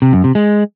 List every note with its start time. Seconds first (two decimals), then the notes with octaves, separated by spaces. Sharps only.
0.02 C3
0.13 F#2
0.24 C3
0.35 G#3